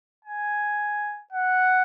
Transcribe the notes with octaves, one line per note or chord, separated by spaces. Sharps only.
G#5
F#5